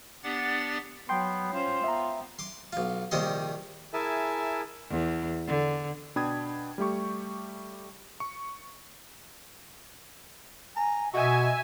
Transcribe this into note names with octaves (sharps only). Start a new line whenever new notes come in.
B3 D4 G4 D5 F#5 A6
F#3 B3 G5 C6
C#4 F4 C5
B3 E5 A#5
C6 D6
B1 F4
A#1 C3 D#3 G3 D#5 C6
E4 G#4 A#4 E5 G#5 A5
E2
D3
B2 D4 G5 B5 D#6 G#6
G3 A3 G4 C#6
C#6
G#5 A#5
B2 F#4 D#5 E5 G#5